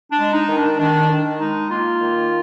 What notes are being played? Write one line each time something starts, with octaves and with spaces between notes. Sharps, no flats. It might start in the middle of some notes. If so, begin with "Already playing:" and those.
D4
G#3
D#4
D#3
D4
D#3 D4
D#3
G#3 D#4
A#3 F4
D#3